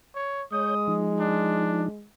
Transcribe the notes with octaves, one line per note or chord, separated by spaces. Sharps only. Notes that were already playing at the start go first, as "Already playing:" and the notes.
C#5
G#3 C#5 D#6 G6
F3 D#4
D4